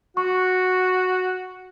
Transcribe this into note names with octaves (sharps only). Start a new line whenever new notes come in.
F#4 C#6